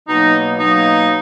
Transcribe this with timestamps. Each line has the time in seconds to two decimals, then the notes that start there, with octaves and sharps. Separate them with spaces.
0.08 B2 F#3 A#3 D#4
0.58 B2 F#3 A#3 D#4